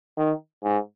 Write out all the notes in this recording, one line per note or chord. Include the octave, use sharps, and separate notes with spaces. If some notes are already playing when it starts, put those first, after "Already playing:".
D#3
G#2